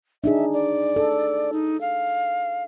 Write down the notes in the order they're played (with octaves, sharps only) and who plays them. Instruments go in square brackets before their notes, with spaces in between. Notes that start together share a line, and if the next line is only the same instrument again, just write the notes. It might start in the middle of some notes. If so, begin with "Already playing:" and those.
[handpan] D4 D#4 G#4 [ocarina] E5
[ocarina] D5
[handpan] A4
[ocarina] D#4
F5